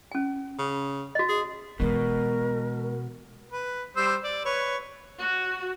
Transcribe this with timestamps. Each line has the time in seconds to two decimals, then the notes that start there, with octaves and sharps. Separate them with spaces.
0.12 C#4 G#5
0.59 C#3
1.15 F#4 D#5
1.29 G#4
1.80 B2 E3 G#3 A#4
3.52 B4
3.96 G3 C5 E6
4.24 D5
4.45 B4 C#5
5.20 F#4